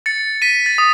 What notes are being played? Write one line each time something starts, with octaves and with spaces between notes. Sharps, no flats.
A6 C#7
B6 D#7
A6
D#6